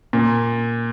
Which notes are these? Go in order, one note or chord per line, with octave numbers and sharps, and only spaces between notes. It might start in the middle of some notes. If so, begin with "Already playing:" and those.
A#2